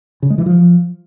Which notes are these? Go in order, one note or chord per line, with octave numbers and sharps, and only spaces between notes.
C#3
G#3
E3
F3